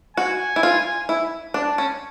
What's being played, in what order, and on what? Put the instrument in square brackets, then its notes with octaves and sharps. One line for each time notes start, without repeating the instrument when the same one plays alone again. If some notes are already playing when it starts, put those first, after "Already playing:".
[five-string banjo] F#4 [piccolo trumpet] G#5
[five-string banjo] E4
F4
E4
[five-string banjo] D4 [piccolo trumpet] A5
[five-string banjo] C#4